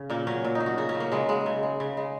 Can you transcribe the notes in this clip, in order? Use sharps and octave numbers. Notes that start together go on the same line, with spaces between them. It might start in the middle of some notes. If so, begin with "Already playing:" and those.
Already playing: C#3 C#4
A#2 A#3
F#3 C#4
A#2
D#4
F#3
F#4
C#3 F#4
C#4
F#3
A#3
C#3 G#3
F#3 G#3
C#3
G#3
C#3
G#3